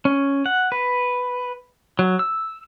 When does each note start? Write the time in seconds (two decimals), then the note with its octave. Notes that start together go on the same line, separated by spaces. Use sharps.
0.05 C#4
0.46 F#5
0.72 B4
1.99 F#3
2.19 E6